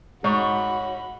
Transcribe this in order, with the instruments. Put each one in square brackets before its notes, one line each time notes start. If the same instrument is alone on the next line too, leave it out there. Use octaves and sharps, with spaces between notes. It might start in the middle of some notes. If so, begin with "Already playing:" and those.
[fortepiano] G#2 [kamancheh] F#4 B5 [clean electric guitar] C#5